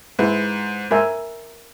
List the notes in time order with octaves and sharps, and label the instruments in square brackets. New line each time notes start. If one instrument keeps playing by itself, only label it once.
[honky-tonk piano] G#2 [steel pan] E4 G#4 B4 E5
[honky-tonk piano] G#2 [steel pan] A#4 E5 G#5